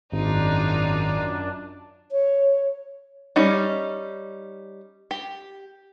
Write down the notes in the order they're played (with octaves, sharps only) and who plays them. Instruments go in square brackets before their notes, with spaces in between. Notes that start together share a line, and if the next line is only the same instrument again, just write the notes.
[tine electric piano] G#1 [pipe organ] F#2 D4 [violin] D#4 F4
[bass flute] C#5
[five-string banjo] G3 C#4 D#4
G4